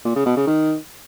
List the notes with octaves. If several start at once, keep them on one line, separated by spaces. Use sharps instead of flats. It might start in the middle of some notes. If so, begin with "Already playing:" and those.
A#2
C#3
B2
C#3
D#3